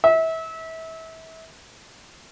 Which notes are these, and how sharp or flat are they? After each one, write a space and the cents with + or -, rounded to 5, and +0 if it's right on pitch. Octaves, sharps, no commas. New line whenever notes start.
E5 -30